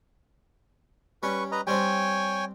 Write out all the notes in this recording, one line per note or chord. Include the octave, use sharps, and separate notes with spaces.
G3 C#4 B4 C#6
B4 D#5 A#5
G3 C4 D4 C#5 G5 G#5